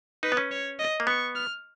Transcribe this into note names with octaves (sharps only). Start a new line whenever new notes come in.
D#4 B4
B3
C#4
C#5
D#5
A#3
B3 C#6
F6